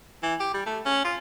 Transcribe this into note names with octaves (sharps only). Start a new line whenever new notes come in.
E3
G4
G3
A3
C#4
F4